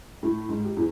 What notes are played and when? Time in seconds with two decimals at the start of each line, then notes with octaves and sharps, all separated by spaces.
0.23 A2
0.49 G#2
0.65 G4
0.77 E2